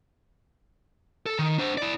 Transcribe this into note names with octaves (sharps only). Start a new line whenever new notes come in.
A4
D#3
D4 C5
E4 D5